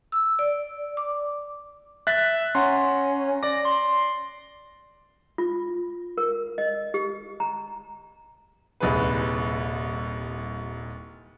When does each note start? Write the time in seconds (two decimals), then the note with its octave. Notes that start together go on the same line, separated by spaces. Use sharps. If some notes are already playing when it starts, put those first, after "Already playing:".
0.12 E6
0.39 D5
0.97 D6
2.07 E5 F#6 A6 B6
2.55 C#4 F#5 A#5 C6
3.43 D5 D6 A#6
3.65 C6
5.38 F4
6.18 A#4
6.58 D#5
6.94 G4
7.40 A#5
8.80 D#1 C2 G#4 B4